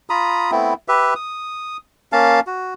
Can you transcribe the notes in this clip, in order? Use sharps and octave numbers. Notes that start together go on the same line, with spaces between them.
F4 A#5 B5 D#6
A3 B3 C4 E4
G4 B4 E5
D#6
A#3 C#4 F5 A5
F#4